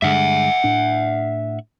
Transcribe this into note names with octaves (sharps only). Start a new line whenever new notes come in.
G2 D3 G#3 E5 F#5
A2 D4